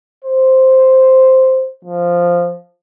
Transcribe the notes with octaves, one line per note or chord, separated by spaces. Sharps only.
C5
F3